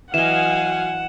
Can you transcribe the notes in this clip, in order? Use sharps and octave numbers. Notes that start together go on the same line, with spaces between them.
E3 F#3 D#5 F5 F#5 G#5 E7